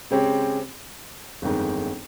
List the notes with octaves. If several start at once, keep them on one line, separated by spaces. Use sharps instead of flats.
C#3 G#3 C4 G4 C#5
G1 F2 D#3 G#3